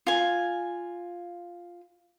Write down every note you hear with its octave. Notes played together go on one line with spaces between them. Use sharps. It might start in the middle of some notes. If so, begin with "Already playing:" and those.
F4 G#5